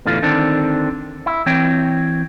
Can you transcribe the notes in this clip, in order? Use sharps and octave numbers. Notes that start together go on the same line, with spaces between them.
E2 A2 D3 E3 F4
D3 D#3 C4 D4
E4
E3 C4 C#5 G5